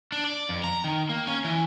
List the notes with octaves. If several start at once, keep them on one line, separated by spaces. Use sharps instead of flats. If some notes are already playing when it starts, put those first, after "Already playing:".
D4
D5
F2
A#5
D#3
A#3
C#4
E3